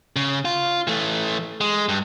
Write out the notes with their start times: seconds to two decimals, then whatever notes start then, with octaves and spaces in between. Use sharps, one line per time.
0.16 C#3
0.45 F4
0.87 E3 A3
1.61 G#3
1.89 G2